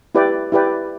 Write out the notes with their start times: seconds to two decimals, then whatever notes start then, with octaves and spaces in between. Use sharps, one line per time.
0.15 E4 G4 B4 D5 G5
0.52 E4 G4 B4 D5 G5